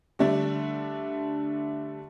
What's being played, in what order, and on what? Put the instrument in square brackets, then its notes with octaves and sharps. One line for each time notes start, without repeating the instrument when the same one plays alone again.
[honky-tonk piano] D3 G3 A3 D4